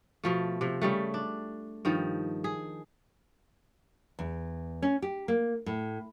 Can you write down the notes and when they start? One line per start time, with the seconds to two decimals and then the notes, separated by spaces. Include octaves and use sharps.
0.24 B2 F3 A3
0.61 C3 F3
0.82 C#3 G3 A3
1.14 D4
1.85 G2 D#3 F3
2.44 G#4
4.19 E2
4.82 C#4
5.02 G4
5.28 A#3
5.66 A2